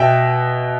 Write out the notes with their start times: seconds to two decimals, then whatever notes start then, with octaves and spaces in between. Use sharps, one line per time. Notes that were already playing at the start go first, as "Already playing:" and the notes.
Already playing: B2 E5 G5